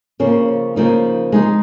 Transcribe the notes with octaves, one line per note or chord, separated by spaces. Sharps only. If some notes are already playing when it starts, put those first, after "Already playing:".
C#3 F3 A#3 C#4
C#3 F3 A#3 D#4
G#3 D#4 G#4